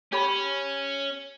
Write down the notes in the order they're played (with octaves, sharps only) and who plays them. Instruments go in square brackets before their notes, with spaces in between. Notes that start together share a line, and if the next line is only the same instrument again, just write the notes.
[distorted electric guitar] C#4 [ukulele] G4 C#5 B5